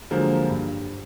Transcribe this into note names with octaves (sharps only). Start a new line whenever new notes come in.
D3 F3 F#3 G#3 A#3
G2